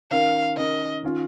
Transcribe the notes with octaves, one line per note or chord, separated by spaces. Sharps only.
D#3 C#4 A#4 F5
D#3 C#4 A#4 D#5
D#3 C#4 F4